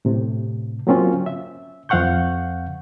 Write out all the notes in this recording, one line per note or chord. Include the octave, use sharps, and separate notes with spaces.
A2 C3
F#3 A#3 C4 C#4 F4
E5
F2 C4 F5 F#5 C#6 G6